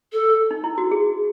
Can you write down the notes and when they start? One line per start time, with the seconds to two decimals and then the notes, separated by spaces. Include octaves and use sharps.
0.13 A4
0.51 D#4
0.64 E4
0.78 F#4
0.91 G#4